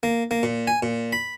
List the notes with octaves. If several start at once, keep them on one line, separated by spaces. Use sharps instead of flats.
A#3
A#3
A#2
G#5
A#2
B5